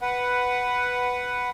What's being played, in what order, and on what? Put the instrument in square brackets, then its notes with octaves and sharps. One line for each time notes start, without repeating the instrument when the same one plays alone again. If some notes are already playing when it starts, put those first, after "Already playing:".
[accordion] B4 F#5